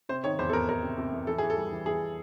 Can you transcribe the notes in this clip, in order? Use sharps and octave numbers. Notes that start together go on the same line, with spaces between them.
C3 C5
D#3 C#5
E2 C5
A4
E2 A#4
E2 A#4
C3
C3
E2
E3 A4
E3 G#4
A4
G3
E3
E3 G#4